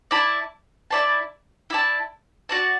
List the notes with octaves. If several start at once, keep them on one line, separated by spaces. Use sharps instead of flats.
E4 D5 A5
E4 D5 A5
E4 D5 A5
F#4 D5 A5